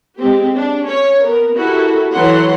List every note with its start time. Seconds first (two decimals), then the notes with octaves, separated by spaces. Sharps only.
0.17 G#3 C4 G4
0.56 D4
0.86 C#4 C#5
1.23 B3 A#4
1.56 E4 F#4 G4 A4 A#4
2.13 E3 F#3 A4 F#5 C6